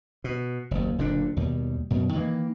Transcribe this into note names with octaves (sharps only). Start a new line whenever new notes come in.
B2
F#1 D#2
F#1 A#2 D3 D4
D#2 B2 G3
F#2 B2
D#3 E3 G3 A#3